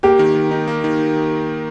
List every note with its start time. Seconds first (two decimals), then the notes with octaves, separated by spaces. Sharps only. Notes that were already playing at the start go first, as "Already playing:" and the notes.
0.03 A#3 G4
0.19 D#3
0.35 D#3
0.51 D#4
0.67 A#3
0.84 D#3